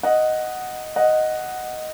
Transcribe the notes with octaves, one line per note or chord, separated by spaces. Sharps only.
D#5 F#5
D#5 F#5